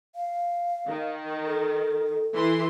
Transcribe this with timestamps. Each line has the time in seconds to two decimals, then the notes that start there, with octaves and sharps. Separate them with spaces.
0.15 F5
0.88 D#3
1.46 A4
2.35 E3 C6